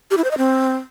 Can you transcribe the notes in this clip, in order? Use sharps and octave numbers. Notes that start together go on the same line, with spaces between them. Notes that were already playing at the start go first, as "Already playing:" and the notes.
G4
E4
C5
D#5
C4